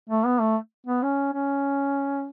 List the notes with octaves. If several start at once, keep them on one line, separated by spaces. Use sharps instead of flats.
A3
B3
A3
B3
C#4
C#4